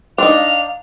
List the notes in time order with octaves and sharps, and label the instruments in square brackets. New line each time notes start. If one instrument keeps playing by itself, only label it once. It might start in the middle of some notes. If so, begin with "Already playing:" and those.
[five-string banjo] D4 D#4 [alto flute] F5 [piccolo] F7